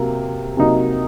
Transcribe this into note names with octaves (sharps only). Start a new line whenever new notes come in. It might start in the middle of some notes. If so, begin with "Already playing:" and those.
Already playing: C3 F#3 A#3
C3 F#3 A#3 D#4